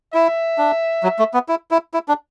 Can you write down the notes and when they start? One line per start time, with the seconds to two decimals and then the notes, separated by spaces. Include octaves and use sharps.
0.13 E4 E5
0.58 D4
1.03 F#3
1.19 A3
1.34 B3
1.49 E4
1.71 E4
1.94 E4
2.08 D4